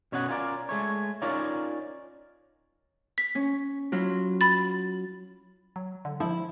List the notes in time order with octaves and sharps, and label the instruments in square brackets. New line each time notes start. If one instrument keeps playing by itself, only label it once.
[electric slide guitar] B2 C#4 C#5 D#5 F#5
C#4 F4 A#4 D5
G#3 A3 C#5
C#4 D#4 F4 A#4 C#5 D5
[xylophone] B6
[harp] C#4
F#3 E4 F4
[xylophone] B5 A6
[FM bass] F#3
D3
[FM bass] F3 [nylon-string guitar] E4